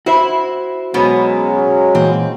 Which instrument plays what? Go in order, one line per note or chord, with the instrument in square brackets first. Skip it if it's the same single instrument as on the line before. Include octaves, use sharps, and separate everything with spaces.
[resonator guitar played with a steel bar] E4 [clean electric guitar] F#4 C5 E5
[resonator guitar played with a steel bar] B2 B3 [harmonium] F#3 G#3 C#4
[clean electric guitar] A#2 E3 [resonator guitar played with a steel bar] C4